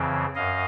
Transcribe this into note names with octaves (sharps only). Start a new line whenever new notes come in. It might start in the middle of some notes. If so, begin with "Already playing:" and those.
Already playing: F2 C#3 E3 C4
F#2 D#5 F5